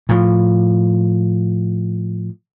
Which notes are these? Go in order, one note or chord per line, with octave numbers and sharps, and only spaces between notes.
A2 F3